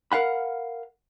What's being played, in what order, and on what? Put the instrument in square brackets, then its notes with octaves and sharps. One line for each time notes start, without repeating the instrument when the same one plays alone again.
[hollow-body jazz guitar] A#4 F5 F#5 B5